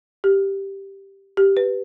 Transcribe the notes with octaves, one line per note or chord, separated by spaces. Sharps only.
G4
G4
B4